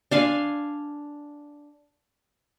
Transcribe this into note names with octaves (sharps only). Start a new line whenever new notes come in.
D4 F5 G#5 C6